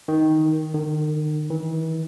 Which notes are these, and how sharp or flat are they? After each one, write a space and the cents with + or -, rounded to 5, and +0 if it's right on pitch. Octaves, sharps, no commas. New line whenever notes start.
D#3 +5
D#3 -40
E3 -40